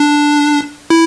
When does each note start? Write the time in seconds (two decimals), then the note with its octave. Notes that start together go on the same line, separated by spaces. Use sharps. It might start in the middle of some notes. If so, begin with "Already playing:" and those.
Already playing: D4
0.90 E4